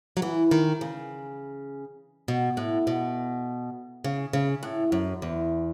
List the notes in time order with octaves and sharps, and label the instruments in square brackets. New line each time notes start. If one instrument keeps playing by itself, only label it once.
[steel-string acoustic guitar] F#3
E3
D#3
C#3
B2
A2
B2
C#3
C#3
A2
F#2
E2